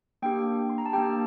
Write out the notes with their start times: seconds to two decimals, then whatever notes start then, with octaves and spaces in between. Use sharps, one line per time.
0.22 A#3 D4 G4 G5
0.69 C6
0.78 A#5
0.86 A5
0.93 A#3 D4 G4 G5